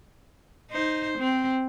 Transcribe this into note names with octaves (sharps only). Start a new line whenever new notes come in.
D#4 C5
C4